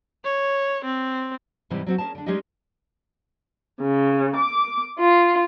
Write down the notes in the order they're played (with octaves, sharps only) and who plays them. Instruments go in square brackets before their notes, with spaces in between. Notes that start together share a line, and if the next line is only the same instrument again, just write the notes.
[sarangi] C#5
C4
[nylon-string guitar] G#2 C3 E3 G3 C4 G4
F#3 C4 F#4
C#4 G#4 A#4 A5
D3 D4
G3 G#3 C#4 D#4 G4 D#5
[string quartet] C#3
D6
F4